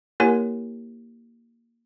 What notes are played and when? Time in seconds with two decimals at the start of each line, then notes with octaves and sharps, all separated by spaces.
0.20 A#3 E4 G4 A#4 C#5 G#5